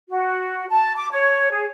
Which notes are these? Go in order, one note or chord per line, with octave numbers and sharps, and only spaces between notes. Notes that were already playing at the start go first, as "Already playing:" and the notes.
F#4
A5
D6
C#5
G#4